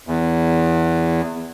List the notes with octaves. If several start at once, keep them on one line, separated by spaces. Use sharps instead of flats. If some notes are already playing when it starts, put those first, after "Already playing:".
E2